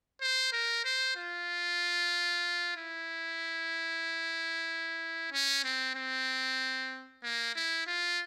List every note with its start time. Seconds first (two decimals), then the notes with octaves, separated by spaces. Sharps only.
0.21 C5
0.53 A#4
0.85 C5
1.16 F4
2.77 E4
5.32 C#4
5.64 C4
5.95 C4
7.23 A#3
7.55 E4
7.87 F4